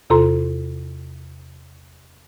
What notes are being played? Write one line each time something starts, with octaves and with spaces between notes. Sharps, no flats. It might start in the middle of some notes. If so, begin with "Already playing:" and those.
E2 C3 F4 A4 A#5 C6